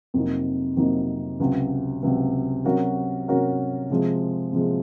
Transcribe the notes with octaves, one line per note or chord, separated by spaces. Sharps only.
F2 C3 F#3 A#3 D#4
F2 C3 F#3 A#3 D#4
C#2 C3 F#3
C#2 C3 F#3
C3 F#3 C#4 F#4 A#4
C3 F#3 C#4 F#4 A#4
C3 F3 G#3
C3 F3 G#3